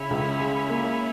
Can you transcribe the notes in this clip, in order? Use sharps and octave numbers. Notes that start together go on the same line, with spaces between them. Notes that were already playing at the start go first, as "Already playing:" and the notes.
Already playing: C#3 C#4 E4
C#2
G#3
A#3